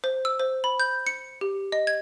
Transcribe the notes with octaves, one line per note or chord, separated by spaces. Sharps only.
C5
E6
C5
B5
G6
C#7
G4
D#5
G#6